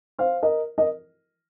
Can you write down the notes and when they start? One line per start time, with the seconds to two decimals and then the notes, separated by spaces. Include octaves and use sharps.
0.19 C5 F5
0.42 A#4 D#5
0.78 A#4 D#5